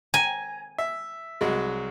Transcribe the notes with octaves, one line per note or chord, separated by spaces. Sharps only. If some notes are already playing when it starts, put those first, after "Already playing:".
G#5 A#5
E5
C2 F#3 G#3